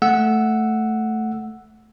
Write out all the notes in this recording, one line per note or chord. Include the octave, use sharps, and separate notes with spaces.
A3 F#5 E6